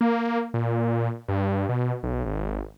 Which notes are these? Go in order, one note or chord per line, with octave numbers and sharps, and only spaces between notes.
A#3
A#2
G2
B2
B1
G#1